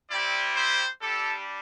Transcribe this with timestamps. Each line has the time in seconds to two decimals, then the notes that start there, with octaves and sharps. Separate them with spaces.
0.10 G3 C4 E4 G4 D5
0.56 C5
1.02 G3 D4 G4 A4